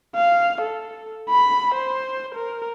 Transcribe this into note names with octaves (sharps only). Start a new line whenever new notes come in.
F5
A4
B5
C5
A#4